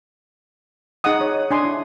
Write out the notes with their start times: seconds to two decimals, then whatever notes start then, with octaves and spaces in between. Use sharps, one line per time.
1.04 D#4 G#4 D#5 F#5 D#6
1.21 C#5
1.51 D4 G#5 C6 D#6
1.65 E4